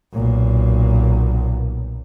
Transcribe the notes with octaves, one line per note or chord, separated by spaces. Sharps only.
B1 A#2